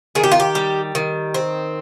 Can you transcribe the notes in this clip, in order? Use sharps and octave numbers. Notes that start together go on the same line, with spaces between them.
D#3 G#4
G4
F4
G4
G3
D#3
C4